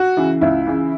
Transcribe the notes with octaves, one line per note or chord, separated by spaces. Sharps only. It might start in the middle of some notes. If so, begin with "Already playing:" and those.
Already playing: F#4
C#3 E3
C#2 E4
C#3 E3